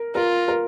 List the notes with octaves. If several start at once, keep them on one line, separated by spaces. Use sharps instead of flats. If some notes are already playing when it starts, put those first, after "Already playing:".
Already playing: A#4
F4 A#4
A#4